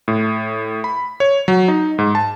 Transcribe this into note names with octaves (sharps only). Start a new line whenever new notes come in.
A2
B5
C#5
F#3
D#4
G#2
A5